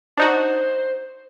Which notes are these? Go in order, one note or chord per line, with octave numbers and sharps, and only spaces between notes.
D4 D#4 F#4 C5